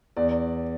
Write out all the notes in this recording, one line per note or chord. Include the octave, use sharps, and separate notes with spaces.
E2 D5